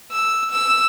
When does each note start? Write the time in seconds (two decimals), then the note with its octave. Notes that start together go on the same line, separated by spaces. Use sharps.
0.12 E6
0.50 E6